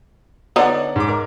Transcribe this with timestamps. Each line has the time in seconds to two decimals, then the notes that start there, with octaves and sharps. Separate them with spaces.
0.56 D3 B3 D#4 C#5 D5 F#5
0.96 G#2 D6
1.09 A#4